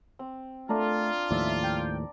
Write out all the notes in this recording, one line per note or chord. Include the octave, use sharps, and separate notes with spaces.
C4
A3 D4 F4 A#4
D#2 A2 F3 D5 E5
G5